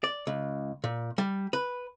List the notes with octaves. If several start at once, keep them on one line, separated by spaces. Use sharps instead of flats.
D5
C#2
A#2
G3
B4